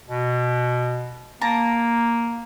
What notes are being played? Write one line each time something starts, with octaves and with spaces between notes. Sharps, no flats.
B2
A#3 A5 A#5